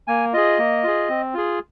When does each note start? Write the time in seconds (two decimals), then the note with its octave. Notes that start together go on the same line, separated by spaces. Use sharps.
0.07 A#3 G#5
0.33 F4 G#4 D#5
0.58 A#3
0.84 F4 G#4
1.09 C4
1.34 F4 G#4